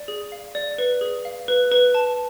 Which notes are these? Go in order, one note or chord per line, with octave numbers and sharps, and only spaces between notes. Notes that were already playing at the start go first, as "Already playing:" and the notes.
Already playing: D5
G#4
F5
D5
B4
G#4
F5
B4
B4
A5